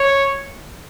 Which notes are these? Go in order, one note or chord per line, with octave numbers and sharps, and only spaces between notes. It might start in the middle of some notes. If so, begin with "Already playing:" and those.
Already playing: C#5